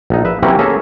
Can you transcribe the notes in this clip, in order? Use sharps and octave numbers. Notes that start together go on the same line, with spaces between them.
A#1 D#4
B4 E5
C3 E3 F#3 A#3 C4 C#4
A#3 C#4 G#4 A4 E5 A#5